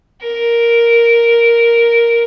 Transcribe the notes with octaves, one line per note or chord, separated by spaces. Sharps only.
A#4